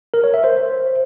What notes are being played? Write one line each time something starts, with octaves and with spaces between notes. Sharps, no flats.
A#4
C#5
E5
C5